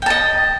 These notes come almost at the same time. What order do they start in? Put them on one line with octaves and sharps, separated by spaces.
G5 A5 D#5